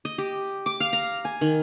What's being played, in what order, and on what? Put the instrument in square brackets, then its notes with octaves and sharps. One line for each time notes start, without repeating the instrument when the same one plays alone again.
[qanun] D#5
G4
D6
F5
A#5
G#5
D#3